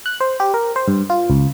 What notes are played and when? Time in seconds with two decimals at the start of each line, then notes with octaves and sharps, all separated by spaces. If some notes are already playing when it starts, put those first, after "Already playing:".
0.06 F#6
0.20 C5
0.40 G4
0.54 A#4
0.76 C5
0.88 G2
1.10 F4
1.30 C#2